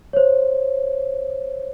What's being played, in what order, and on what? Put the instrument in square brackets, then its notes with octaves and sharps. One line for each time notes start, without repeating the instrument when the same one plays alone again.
[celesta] C5 C#5